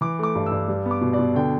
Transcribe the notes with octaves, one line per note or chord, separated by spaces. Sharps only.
E3 D6
A3 D6
G2
E6
G2
G3
B3
D6
B2
D5
B2
D3 G5